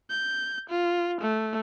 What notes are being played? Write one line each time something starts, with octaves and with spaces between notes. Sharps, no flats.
G6
F4
A3